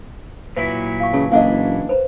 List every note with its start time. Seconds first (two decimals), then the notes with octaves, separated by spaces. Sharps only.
0.56 A#2 F#3 E4 B4 E5 G#5
1.00 F5 C#6
1.13 C#3 E3 G#5 A5
1.32 F#1 E3 D4 D#5 F5 F#5
1.89 B4 C5 A#5